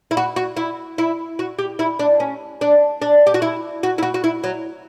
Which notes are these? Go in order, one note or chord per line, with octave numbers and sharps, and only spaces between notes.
E4
F#4
F#4
E4
E4
F#4
G4
E4
D4
C#4
D4
D4
G4
F#4
E4
F#4
E4
F#4
F#4
E4
F#3